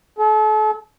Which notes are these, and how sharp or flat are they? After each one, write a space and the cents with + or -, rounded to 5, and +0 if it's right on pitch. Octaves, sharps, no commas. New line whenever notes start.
A4 -40